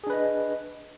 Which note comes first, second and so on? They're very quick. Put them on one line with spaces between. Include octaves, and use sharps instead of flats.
G#4 D4 B4 D#5